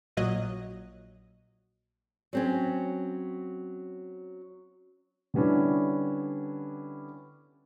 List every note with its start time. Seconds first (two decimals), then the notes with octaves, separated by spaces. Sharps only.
0.17 A#1 A#2 F#3 D#5 F#6
2.33 F#3 C4 C#4
5.34 D3 G3 B3 C#4 D4 E4